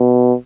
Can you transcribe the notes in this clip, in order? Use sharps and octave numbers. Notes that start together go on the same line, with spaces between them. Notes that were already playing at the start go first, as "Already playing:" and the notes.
Already playing: B2